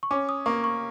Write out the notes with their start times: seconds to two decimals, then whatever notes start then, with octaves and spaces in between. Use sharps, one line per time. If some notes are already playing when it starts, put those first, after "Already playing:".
0.03 C#6
0.11 C#4 D6
0.29 D#6
0.46 A#3 C#6
0.64 C#6